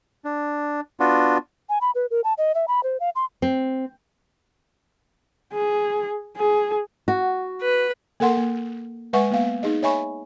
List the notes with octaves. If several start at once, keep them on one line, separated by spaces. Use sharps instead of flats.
D4
B3 D4 F4 F#4
G#5
B5
B4
A#4
A5
D#5
E5
B5
C5
F5
C6
C4
G#4
G#4
F#4
B4
A#3 A4 A#4 F#5 C6
A#3
G#3 B4 E5 F#5 G#5 C#6
A#3 B3 F5
D#4 G#4 D#5
C#5 D#5 E5 G#5 B5 C#6